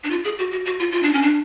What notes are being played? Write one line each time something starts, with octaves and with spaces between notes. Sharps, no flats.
D4
F4
G#4
F#4
F#4
F#4
F4
F4
D4
C#4
D4